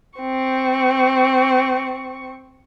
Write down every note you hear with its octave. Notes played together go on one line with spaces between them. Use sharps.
C4 C#6